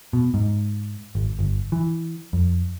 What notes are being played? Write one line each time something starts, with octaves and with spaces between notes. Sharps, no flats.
B2
G#2
G#1
G1
E3
F2